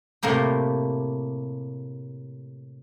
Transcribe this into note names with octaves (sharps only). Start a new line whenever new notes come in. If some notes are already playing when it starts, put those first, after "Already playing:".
A2 C3 A3 A#3 G4